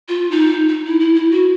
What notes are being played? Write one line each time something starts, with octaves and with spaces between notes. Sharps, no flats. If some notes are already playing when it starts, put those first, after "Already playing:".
F4
D#4
D#4
E4
E4
E4
F#4